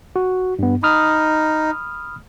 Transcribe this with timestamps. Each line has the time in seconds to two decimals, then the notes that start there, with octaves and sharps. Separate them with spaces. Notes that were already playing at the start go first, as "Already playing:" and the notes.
0.16 F#4
0.59 G2 B3
0.83 D#4 B5 D#6 F6